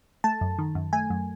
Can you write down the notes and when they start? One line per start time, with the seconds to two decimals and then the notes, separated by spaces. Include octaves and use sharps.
0.24 A3 A5
0.41 F#2
0.59 D#3
0.75 F#2
0.93 A3 G#5
1.10 F#2